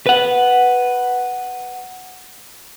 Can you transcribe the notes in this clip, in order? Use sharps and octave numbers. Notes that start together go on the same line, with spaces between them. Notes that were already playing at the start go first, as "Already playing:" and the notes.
B4 F#5